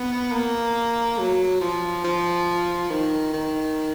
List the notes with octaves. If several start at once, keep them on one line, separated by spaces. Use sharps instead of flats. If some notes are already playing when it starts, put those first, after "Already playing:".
Already playing: B3
A#3
F#3
F3
F3
D#3
D#3